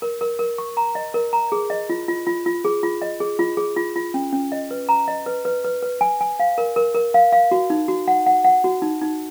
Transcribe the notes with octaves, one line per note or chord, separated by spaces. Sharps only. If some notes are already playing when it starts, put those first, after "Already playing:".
A#4
A#4
A#4
C#6
A#5
D#5
A#4
A#5
G#4
D#5
F4
F4
F4
F4
G#4
F4
D#5
G#4
F4
G#4
F4
F4
C#4
C#4
D#5
B4
A#5
D#5
B4
B4
B4
B4
G#5
G#5
F5
A#4
A#4
A#4
F5
F5
F#4
D#4
F#4
F#5
F#5
F#5
F#4
D#4
D#4